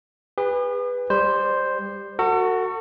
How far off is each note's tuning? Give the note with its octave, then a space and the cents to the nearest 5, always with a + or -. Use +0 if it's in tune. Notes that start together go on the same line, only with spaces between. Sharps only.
G#4 -45 B4 +0
G3 +20 C5 +0
F#4 +0 A4 +40